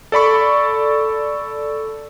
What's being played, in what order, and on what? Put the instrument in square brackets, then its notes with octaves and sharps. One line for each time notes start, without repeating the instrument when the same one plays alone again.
[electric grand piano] A4 D5 B5 C#6